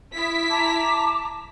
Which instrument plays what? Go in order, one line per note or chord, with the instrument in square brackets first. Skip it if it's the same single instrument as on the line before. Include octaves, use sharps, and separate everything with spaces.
[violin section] E4 B6 [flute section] D#6
[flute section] A5 A#5 D6